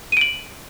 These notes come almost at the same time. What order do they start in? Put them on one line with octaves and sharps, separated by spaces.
D#7 D7 F#7